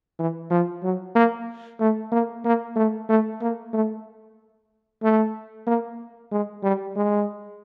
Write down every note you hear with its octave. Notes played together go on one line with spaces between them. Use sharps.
E3
F3
F#3
A#3
A3
A#3
A#3
A3
A3
A#3
A3
A3
A#3
G#3
G3
G#3